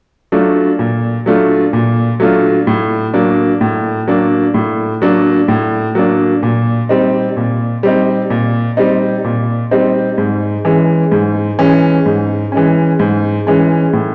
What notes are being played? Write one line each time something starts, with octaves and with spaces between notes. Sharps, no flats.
F#3 A3 D4 F4
A#2
F#3 A3 D4 F4
A#2
F#3 A3 D4 F4
A2
F#3 A#3 D4
A2
F#3 A#3 D4
A2
F#3 A#3 D4
A2
F#3 A#3 D4
A#2
G3 C4 D#4
A#2
G3 C4 D#4
A#2
G3 C4 D#4
A#2
G3 C4 D#4
G#2
E3 G#3 C#4
G#2
E3 G#3 C#4
G#2
E3 G#3 C#4
G#2
E3 G#3 C#4
A2